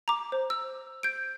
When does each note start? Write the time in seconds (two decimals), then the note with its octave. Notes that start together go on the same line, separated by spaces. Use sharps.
0.08 A#5 D6
0.32 C5
0.50 E6
1.03 G6 D7